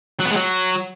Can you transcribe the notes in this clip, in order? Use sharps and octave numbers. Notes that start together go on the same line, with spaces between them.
F#3
B3
G#3
F#3